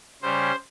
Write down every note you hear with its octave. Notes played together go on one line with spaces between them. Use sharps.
C#3 G3 C#4 C5